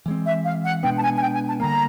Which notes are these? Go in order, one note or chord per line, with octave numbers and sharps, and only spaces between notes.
E3 G#3 C4
E5
F5
F#5
B2 G#3 B3 D4 G5
A5
G#5
G#5
G5
G#5
A5
D3 G3 A#3 A#5